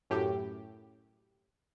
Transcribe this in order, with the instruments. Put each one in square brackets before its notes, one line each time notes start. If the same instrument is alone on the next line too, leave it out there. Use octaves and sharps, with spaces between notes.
[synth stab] F#2 A2 G4